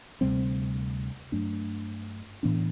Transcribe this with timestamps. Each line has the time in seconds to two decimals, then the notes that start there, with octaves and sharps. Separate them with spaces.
0.21 D2 C3 G3 C4
1.32 G2 F#3 A3 D4
2.43 A2 E3 B3 D4